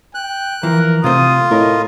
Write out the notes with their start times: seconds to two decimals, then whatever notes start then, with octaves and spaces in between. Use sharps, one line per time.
0.15 G5 F#6
0.63 E3 F3 A#4
1.04 C3 A3 C4 F4 D#6
1.51 A2 A#4 D#5